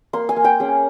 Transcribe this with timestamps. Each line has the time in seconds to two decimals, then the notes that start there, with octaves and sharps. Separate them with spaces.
0.13 A#3 C6
0.29 G#5
0.36 A#3
0.44 G5
0.60 C#4 G#4